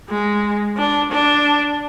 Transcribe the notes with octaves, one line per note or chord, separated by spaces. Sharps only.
G#3
D4
D4